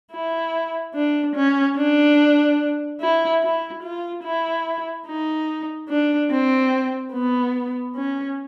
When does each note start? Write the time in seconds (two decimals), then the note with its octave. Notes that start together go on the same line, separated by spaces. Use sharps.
0.12 E4
0.95 D4
1.36 C#4
1.77 D4
3.01 E4
3.42 E4
3.83 F4
4.24 E4
5.07 D#4
5.89 D4
6.30 C4
7.13 B3
7.95 C#4